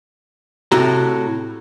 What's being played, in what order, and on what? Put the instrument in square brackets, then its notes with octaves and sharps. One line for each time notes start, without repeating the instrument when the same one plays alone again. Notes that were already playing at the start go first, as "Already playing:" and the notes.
[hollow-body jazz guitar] A2 C3 F#4 A#5